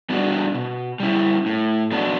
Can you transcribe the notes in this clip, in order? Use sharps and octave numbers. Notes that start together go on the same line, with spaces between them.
G3 B3 D4 F#4
B2
G3 C#4 E4
A2
F#3 B3 D4 F#4